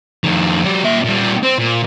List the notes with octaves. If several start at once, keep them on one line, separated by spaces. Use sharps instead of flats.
F2 D#3
F#3 G4
A#2 E5
A#2 G3
C4
A#2